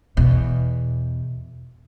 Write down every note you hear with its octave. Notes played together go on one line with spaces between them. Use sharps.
E2 B2